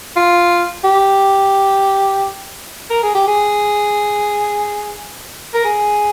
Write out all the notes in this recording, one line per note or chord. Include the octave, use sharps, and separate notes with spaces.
F4
G4
A#4
G#4
G4
G#4
A#4
G#4